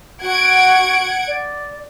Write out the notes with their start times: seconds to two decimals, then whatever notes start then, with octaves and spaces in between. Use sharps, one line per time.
0.22 F#4 F#5 G#6 D7
1.28 D5